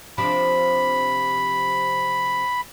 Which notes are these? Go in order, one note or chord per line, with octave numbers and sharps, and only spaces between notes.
C3 F3 D4 B5